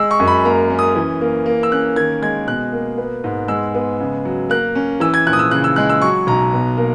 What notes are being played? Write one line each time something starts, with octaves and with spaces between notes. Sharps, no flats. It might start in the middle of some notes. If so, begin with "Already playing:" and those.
Already playing: G#3 E6
C#6
F#2
B5
A#3 A#5
C#4
D#6
E3
A#3
A#3
E6
C#4 F#6
D#3 G#6
G#3 G#6
B2 F#6
A#3
B3
G#2
G#3 E6
B3
C#3
F#3
A#3 F#6
C#4
E3 E6
G#6
A#1 F#6
D#6
E6
C#3 F#6
E6
G#3 F#6
E6
F#3 C#6
B1 A#5
B2
A#3